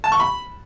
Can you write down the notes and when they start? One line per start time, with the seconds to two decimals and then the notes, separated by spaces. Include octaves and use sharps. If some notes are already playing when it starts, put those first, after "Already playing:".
0.04 A5
0.12 C#6
0.20 B5